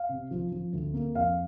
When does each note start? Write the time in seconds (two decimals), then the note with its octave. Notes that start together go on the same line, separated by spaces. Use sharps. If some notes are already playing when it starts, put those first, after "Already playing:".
Already playing: F5
0.09 C3
0.31 F3
0.52 F3
0.73 D2
0.94 A#3
1.15 F2 F5